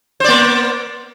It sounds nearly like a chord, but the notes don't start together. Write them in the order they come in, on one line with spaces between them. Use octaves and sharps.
C5 D5 A#3